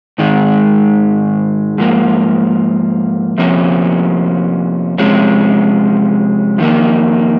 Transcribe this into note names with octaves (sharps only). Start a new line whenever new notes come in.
G#2 D#3 G#3
G#2 F3 A#3
F2 C3 F3 A#3 C#4
C3 F3 G#3 C#4
F2 D#3 A#3